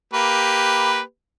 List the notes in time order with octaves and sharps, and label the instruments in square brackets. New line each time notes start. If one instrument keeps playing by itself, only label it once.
[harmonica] A#3 G4 B4